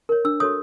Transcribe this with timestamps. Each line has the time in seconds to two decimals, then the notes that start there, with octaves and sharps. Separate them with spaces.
0.09 A#4 C#5
0.25 D4 E6
0.40 F#4 A4 C#5 D#6